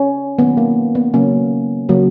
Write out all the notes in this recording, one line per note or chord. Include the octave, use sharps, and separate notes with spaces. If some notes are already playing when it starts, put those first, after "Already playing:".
Already playing: C#4
D#3 F#3 A#3 B3
A#3
B3
C#3 F#3 A#3 C#4
C#3 F#3 A#3